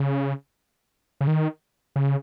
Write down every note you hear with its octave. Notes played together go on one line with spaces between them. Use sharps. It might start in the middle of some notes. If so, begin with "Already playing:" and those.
Already playing: C#3
C#3
D#3
C#3